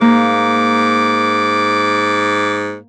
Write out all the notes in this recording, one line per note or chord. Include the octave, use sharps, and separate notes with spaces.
G#2 A#3 D6